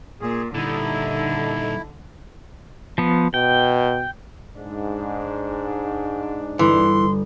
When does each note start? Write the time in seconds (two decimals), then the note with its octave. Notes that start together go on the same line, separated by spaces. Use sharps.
0.21 A#2 G#4
0.54 A#2 D3 G3 D#4 E4 A4
2.98 F3 B3
3.34 B2 G5
4.56 G#2 D4
6.59 G1 E3 C6